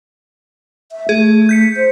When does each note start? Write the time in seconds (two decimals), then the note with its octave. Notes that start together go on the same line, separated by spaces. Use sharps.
0.92 E5
1.09 A3 G#4
1.49 G6 B6 C#7
1.77 C5